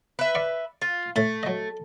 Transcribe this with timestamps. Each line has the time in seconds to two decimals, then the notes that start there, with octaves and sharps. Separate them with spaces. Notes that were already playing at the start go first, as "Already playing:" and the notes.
0.19 B4 E5
0.35 D5 F5 C#6
0.82 F4
1.16 A2 A3
1.43 F#3 D#5